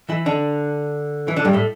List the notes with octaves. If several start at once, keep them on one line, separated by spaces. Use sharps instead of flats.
E3 E4
D3 D4
E3 E4
D3 D4
G2 G3
A2 A3